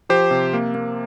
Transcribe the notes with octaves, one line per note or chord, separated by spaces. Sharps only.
F3 G4 C5
C3
A#3
A#3